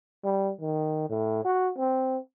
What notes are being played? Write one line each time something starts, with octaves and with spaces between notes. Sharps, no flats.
G3
D#3
A2
F#4
C4